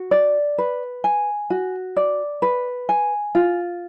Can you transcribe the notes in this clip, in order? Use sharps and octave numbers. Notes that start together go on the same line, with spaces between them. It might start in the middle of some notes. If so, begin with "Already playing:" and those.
Already playing: F#4
D5
B4
G#5
F#4
D5
B4
G#5
F4